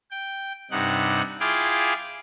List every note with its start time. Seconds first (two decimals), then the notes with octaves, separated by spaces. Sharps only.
0.11 G5
0.71 G2 C3 D#4 F#5
1.40 E4 F4 G#4 F5 G5 D6